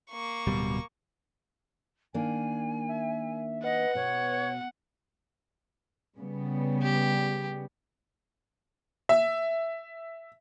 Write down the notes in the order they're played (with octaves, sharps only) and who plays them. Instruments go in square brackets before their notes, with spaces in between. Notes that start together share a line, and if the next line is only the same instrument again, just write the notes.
[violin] A#3 C#6
[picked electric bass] D1 B2 G3
[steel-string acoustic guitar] D#3 A#3 D4 [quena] G#5
[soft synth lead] E5
[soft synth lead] B4 [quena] D#5 [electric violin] F#5
[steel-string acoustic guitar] B2 [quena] C#5
[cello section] C#3 G3 B3
[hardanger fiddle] G4
[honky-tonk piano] E5